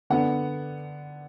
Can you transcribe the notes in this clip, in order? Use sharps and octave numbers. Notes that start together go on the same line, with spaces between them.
D3 B3 D4 F#5